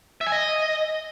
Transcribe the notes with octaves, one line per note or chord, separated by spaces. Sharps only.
E5
G#5
D#5